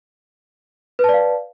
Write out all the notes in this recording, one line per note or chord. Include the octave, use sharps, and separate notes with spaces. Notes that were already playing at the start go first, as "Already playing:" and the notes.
B4 D5 F5 A5